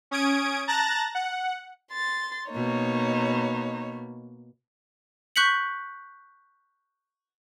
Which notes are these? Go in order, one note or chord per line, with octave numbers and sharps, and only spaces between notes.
C#4 D#6 G#6 D7
A5 A#5 F#6 A6 A#6
F#5
C6 A6
B2 A#3 D#4 C#5
C#6 F#6 G6 B6 C#7 F#7